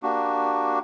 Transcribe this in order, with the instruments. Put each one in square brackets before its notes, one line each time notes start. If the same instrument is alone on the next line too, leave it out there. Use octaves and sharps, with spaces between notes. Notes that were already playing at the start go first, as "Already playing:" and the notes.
[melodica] A#3 D4 F#4 G4